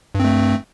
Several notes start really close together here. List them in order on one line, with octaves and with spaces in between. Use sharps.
G2 C4 A3